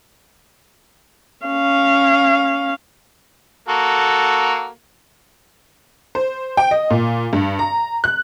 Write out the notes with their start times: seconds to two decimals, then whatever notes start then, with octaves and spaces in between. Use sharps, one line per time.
1.46 C#4 F5
3.69 A#3 F#4 A4
6.15 C5
6.57 G5
6.71 D#5
6.90 A#2
7.33 G2
7.59 A#5
8.04 F#6